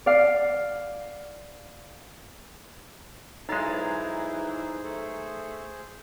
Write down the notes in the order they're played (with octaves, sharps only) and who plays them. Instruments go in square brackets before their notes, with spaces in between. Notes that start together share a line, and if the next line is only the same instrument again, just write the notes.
[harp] D5 F5
[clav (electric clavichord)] B1 G#3 [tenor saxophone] E3 [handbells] D#4 A#5 A6 [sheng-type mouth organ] G#4 C5
[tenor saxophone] A3